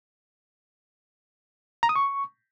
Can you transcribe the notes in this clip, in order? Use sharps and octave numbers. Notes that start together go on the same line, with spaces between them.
A#5
D#6
C#6